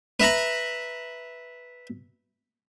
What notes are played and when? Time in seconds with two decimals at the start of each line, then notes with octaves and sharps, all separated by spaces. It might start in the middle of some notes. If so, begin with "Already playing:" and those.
0.20 B4 E5 A#5 B5